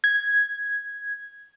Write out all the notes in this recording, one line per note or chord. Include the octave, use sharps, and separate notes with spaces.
G#6